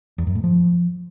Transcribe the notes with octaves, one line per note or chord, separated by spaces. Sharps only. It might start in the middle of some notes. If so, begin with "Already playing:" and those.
E2
F#2
A2
F3